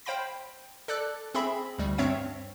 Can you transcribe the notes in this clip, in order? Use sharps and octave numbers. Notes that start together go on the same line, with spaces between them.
C5 F5 G5 B5 A#6
A4 D5 D6 F#6
C4 G#4 E5 B5
D2 G3
G2 C4 C#5 E5 F5 D7